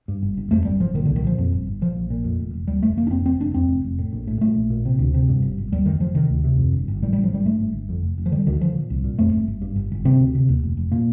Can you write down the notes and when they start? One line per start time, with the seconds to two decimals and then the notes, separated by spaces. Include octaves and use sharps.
0.08 G2
0.23 G1
0.37 G1
0.51 F2 A3
0.65 G1 G3
0.80 G1 F3
0.94 A#2 D#3
1.05 D3
1.09 C2
1.16 D#3
1.24 A#2 F3
1.38 F2
1.52 G1
1.67 G1
1.81 A#2 F3
1.96 A#1
2.10 A#2
2.24 F2
2.40 F1
2.54 F1
2.68 D#2 G3
2.83 F1 A3
2.97 F1 A#3
3.07 D4
3.11 F2 C4
3.26 F1 C4
3.40 F1 D4
3.54 F2 C4
3.69 F1
3.84 F1
3.99 A2
4.13 A#1
4.27 A2
4.41 A#2 A3
4.56 A#1
4.70 A#2
4.85 C3
4.99 D2
5.14 C3
5.29 G2
5.42 G1
5.58 G1
5.72 D#2 G3
5.86 F1 D#3
6.00 F1 F3
6.15 C3 D#3
6.29 D2
6.44 C3
6.58 F2
6.73 G1
6.88 G1
7.02 A2 G3
7.13 G3
7.16 A1
7.24 F3
7.31 A2 G3
7.45 G2 A3
7.60 G1
7.74 G1
7.89 F2
8.03 F1
8.18 F1
8.26 F3
8.31 D3 G3
8.47 D2 D#3
8.61 D3 F3
8.75 A#2
8.90 C2
9.04 A#2
9.19 F2 A3
9.33 G1
9.48 G1
9.62 G2
9.76 G1
9.92 G1
10.05 C3 C4
10.20 D2
10.35 C3
10.49 D#2
10.63 F1
10.77 F1
10.92 A#2 A#3